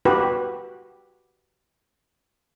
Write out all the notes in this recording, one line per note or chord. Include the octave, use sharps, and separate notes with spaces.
F#4 G4 B4